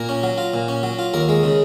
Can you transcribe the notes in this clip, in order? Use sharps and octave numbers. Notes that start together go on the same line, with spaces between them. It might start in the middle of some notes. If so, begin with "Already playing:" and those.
Already playing: A#2 A#4
C#4
F#3
F4
A#2
C#4
F#3
F4
D#2 A#4
G#3
C#3